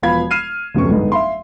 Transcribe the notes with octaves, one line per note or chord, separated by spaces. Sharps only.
E1 F3 B3 F5 B5 G#6
F6 C7 D#7 E7
D1 F2 C3 B3 C#4 C#6
G1 G#2 B3 D#4
E5 F5 C6